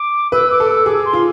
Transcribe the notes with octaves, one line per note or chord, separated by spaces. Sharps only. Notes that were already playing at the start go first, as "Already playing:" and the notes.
Already playing: D6
B4 E6
D6
A4
E6
G#4 D6
C6
F4